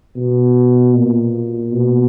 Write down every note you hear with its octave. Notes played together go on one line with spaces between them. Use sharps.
B2
A#2
B2